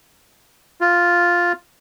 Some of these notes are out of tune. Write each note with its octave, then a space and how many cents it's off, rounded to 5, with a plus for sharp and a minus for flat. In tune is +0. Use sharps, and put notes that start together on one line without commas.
F4 +0